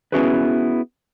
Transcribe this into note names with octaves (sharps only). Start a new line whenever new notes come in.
B3 C#4 E4 F#4 G#4 B4